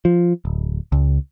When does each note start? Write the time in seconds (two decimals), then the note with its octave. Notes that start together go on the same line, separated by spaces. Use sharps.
0.05 F3
0.45 D1
0.92 C#2